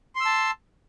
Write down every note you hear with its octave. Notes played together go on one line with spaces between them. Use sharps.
A5 C6 E6